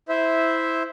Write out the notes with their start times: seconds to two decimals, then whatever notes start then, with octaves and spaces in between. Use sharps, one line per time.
0.09 E4 C5 E5